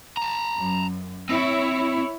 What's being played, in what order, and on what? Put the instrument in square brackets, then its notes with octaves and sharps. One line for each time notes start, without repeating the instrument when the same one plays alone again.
[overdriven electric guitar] A5 A#5
[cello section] F#2
[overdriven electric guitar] C4 [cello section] E4 C#5